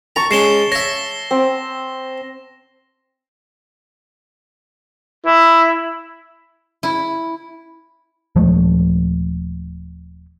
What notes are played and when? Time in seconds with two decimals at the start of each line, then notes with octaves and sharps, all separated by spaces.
0.16 A5 A#5 C#6
0.31 G#3 C#4 C7 E7 G7
0.72 C#5 E5 A#6
1.31 C4
5.25 E4
6.83 E4
8.36 D#1 F3 G#3 A3